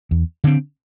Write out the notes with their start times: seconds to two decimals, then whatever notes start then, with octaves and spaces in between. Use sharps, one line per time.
0.11 E2
0.44 D3 C4